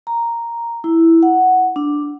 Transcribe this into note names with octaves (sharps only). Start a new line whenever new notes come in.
A#5
E4
F#5
D4